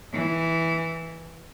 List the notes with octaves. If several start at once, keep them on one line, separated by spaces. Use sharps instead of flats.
E3